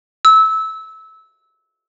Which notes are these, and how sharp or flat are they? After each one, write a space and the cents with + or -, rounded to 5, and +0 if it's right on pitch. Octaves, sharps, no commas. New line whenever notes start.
E6 -20